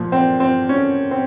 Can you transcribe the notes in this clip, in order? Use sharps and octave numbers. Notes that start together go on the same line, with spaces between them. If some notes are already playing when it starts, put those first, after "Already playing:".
Already playing: A#2 F3
C4
C4
C#4
C4